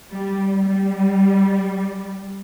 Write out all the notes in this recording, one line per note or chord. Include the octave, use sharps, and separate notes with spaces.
G3
G3